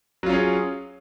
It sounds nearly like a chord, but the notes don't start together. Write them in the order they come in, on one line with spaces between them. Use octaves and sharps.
F#3 F4 C#4 G#4